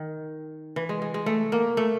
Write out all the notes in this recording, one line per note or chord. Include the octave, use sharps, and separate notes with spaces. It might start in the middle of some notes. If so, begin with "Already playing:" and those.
Already playing: D#3
E3
G#3
G#3
G#3
A3
A#3
A3